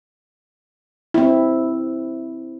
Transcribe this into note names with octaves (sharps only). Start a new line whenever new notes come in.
C4 E4